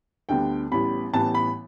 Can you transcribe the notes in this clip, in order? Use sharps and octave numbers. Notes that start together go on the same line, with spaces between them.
D2 D3 G3 B3 G5
A1 A2 G3 B3 B5
A1 A2 E3 G3 B3 A5
B5